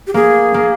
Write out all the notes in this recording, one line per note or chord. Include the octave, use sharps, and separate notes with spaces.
G4
A#3 G#4
A#3